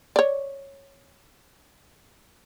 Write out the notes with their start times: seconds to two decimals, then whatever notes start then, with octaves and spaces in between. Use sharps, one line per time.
0.16 C#5 D5